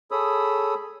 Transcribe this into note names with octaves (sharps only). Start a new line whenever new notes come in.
G#4 A4 C#5 B5 D#6 E6